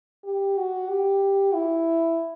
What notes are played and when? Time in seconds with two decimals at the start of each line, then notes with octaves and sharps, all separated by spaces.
0.24 G4
0.57 F#4
0.90 G4
1.54 E4